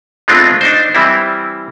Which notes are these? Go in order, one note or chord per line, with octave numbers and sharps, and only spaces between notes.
G#3 A3 B3 C4 D4 F4
D4 D#4 C5
E3 G3 C4 E4